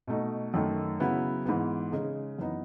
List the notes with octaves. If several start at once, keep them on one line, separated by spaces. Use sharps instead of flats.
B2 A3 D#4
F#2 D#3 A3
C#3 F#3 B3 E4
G#2 E3 B3
C#3 G#3 D#4
F#2 E3 B3 D#4